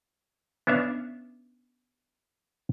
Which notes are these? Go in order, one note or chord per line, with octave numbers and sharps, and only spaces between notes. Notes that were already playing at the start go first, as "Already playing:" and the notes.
B3 C#4 D4 E5 F5